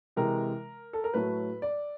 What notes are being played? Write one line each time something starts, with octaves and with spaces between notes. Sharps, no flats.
C3 E3 G#3 A#4
A4
A#4
A2 F#3 A3 B4
D5